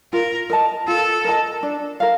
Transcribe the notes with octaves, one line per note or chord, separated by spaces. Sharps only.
F4 A#4
A#4 D#5 A5
F4 A4
A#4 D#5 A5
D4
A#4 F5